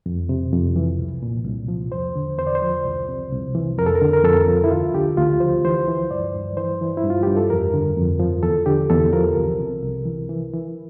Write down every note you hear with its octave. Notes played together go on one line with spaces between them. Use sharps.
F2
C3
F2
E3
C2
A#2
C2
F3
E2 C5
D3
E2 C5
D5
C5
F3
C2
C3
C2
E3
F2 A#4
A4
A#4
D3
A#4
F2 A4
F3
E4
D2 F4
D3 G4
D2 F4
F3 C5
E3 C5
E3
G2 D5
G2
E3 C5
E3
E4
G2
F4
G2 G4
A4
F2 A#4
D3
F2
F3
E2 A4
D3 G4
E2 A4
F3 A#4
C2
C3
C2
E3
E3
E3